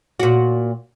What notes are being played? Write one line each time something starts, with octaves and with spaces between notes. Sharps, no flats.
A#2 F#4